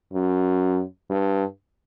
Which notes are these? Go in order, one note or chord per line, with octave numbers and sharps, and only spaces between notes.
F#2
G2